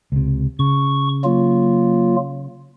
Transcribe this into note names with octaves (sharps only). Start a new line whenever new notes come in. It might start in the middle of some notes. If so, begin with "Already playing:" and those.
C#2 C3
C#3 C#6
F#3 A#3 F4